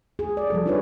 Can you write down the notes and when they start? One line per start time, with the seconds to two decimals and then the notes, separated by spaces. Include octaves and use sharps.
0.19 G#4
0.37 D5
0.50 F3 G3 A4
0.65 D4 D#4 F4 G#4 B4 C#5